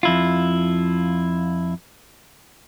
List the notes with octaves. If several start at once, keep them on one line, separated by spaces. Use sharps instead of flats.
F2 E4 F4